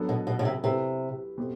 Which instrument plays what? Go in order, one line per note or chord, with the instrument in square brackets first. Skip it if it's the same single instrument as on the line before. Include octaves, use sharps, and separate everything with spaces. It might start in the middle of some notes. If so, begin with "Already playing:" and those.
Already playing: [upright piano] F#3 B3 D4 A4
[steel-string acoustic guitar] B2
B2
B2
C3
[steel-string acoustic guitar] C3 [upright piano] A3 E4 B4
[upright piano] B2 A3 C4 G4